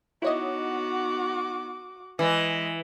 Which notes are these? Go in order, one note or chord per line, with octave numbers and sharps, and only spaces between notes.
B3 D#4 E4 F#4 C#5 D#5 D6
E3 G#3 D#5